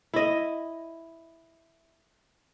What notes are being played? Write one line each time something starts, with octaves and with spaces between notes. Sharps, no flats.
E4 D#5